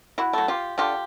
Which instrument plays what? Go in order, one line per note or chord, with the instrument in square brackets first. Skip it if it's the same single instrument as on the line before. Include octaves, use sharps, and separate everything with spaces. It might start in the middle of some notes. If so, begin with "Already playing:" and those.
[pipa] E4 F#4
F#3 A3
F4 G4
D3 F4 G4